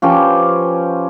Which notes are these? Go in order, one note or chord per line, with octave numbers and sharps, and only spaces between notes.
F3 C#4 G4 B4